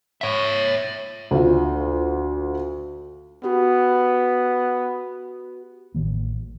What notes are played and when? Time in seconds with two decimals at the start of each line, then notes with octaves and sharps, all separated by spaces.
0.21 C#5 E5
1.31 D2 F4
3.44 B3 F#4 G4 B4
5.95 A1 D#3 A#3